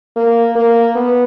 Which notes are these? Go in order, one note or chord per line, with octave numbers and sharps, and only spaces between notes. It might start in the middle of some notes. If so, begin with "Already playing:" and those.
A#3
A#3
B3